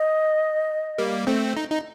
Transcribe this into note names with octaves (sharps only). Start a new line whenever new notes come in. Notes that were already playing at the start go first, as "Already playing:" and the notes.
Already playing: D#5
G3 A#3
A3 C4
D#4
D#4